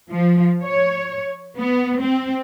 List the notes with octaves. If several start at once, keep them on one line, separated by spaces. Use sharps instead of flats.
F3
C#5
B3
C4